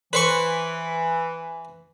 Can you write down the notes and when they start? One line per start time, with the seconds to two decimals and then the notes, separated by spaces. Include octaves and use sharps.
0.13 E3 B4 C5 C#6